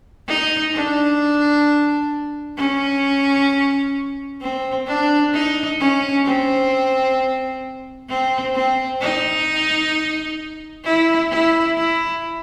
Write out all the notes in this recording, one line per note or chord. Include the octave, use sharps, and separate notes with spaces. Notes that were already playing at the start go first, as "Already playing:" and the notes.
D#4
D4
C#4
C4
D4
D#4
C#4
C4
C4
C4
D#4
E4
E4
E4